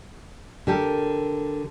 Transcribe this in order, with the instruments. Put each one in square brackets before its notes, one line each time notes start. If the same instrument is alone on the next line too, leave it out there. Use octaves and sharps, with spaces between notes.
[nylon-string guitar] D3 G4 A4 A#4